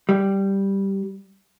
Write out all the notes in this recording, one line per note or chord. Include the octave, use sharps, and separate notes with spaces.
G3